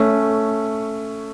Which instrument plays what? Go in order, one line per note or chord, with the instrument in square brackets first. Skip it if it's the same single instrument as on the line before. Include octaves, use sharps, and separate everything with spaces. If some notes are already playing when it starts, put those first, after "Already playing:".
Already playing: [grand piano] A3 C#4